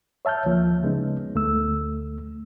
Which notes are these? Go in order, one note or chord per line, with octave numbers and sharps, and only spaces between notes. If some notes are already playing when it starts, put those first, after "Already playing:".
C#5 E5 A5 F6 G6
D2 F3 A#3
C#3 G#3 B3 C#4 D#4
D2 A3 E6